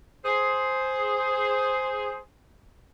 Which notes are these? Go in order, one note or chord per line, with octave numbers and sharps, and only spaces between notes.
G#4 C5